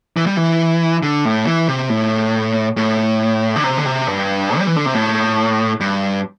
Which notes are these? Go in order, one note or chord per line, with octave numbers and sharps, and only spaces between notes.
E3
G3
E3
D3
A2
E3
C3
A2
A2
D3
C3
D3
C3
G2
G3
E3
D3
C3
A2
G2